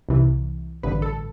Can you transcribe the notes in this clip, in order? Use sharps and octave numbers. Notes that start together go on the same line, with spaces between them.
C2 C3 E3
A1 G2 D3 B4
A4